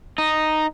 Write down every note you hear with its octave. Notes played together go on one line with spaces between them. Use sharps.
D#4